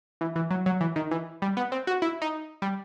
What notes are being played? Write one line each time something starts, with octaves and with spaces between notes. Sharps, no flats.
E3
E3
F#3
F#3
E3
D#3
E3
G3
B3
C4
F#4
E4
D#4
G3